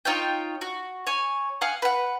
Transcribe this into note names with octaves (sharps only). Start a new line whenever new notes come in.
D#4 F4 C#5 G5
F#4
C#5 G#5
F5 F#5 G#5 D#6
B4 F#5